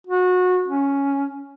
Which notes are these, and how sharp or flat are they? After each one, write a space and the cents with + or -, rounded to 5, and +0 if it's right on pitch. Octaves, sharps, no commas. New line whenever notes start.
F#4 -25
C#4 +5